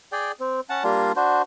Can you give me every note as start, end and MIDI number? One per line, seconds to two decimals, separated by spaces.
0.12 0.32 68
0.12 0.32 74
0.12 0.32 79
0.40 0.60 60
0.70 0.83 61
0.70 0.83 78
0.70 0.83 81
0.84 1.12 55
0.84 1.12 58
0.84 1.12 62
0.84 1.12 65
1.16 1.42 62
1.16 1.42 66
1.16 1.42 72